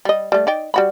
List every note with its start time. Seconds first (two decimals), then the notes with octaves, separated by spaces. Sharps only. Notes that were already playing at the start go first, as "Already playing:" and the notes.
0.05 G3 D#5
0.32 G3 A3
0.47 D#4 D5 G5
0.74 G3 F#4 B5